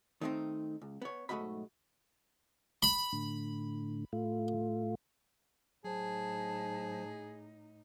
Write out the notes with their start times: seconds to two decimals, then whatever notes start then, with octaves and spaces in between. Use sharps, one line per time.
0.21 D#3 A3 B3 C4 D#4
0.82 C#2
1.02 B3 C#5
1.29 B1 G#2 A3 F#4 D#5 B5
2.83 B5
3.13 A2 D3
4.13 A2 A3 F4
5.85 A2 F#3 D#4 G#4 C5 A5